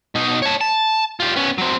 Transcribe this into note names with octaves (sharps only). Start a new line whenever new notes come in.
B2 D#4
C#5 A5
A5
F4 G4
B3 C#4
F#3 C4